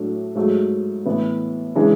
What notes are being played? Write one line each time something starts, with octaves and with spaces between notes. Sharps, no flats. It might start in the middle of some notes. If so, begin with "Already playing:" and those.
Already playing: A2 F#3 A3 D4
G#2 F#3 A3
A2 E3 B3
C#3 E3 G#3 D4